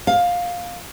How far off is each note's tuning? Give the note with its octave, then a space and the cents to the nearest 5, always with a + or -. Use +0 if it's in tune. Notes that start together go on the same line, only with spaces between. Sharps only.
F5 +10